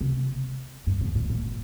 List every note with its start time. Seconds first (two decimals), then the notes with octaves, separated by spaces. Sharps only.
0.01 C3
0.87 G2
1.01 G#2
1.15 A#2
1.30 A#2